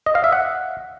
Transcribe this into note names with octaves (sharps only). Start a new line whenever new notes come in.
D#5
F5
E5
F#5